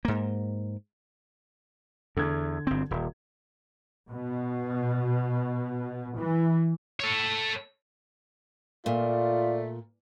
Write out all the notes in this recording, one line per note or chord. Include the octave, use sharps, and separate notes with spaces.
G#2 A#3
E2 D3 G#6
G1 C4
D#1
B2
E3
A4 C#5
A#2 A3 F4 D5